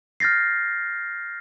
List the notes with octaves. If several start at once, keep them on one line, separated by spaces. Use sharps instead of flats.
F6 G6 A6 A#6 C7